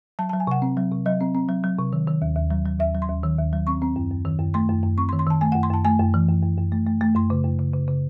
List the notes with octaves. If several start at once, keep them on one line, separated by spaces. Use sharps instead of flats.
F#3 A5
F#3 A5
G#5
C3 F#5
C4
F#3
C3
F#3 D#5
C4
C4
F#3
F#3
C3
D#3
D#3
D#2
D#2
F#3
F#3
D#2 E5
F#3
C6
D#2
D#3
D#2
F#3
C4 C#6
C4
F#2
F#2
D#3
F#2
A3 C6
F#2
F#2
C4 C#6
C6
D#3
C6
D#3 A5
A3 G#5
F#2 F#5
C6
F#2 A5
A3 G#5
F#2
E3
F#2
F#2
F#2
A3
A3
A3
F#2 C6
C#3
F#2
C#3
C#3
C#3